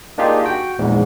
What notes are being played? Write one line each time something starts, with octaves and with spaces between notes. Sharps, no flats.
A#3 D4 D#4 F4 G4 G#4
F#4 G5
A#1 E2 G#2